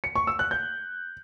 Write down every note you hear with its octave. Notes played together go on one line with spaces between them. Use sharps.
C#7
C#6
E6
F#6
G6